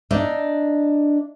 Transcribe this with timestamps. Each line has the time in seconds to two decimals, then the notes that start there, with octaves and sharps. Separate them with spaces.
0.11 D4 D#4 E5